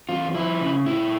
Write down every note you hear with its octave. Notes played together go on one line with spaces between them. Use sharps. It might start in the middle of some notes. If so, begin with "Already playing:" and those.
E2 F4
F3 E4
C#3
A#2 E4